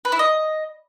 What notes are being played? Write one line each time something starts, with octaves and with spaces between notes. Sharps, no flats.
B4
E4
D#5